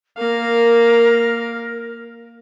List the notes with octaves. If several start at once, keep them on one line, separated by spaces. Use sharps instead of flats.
A#3 A#4 F5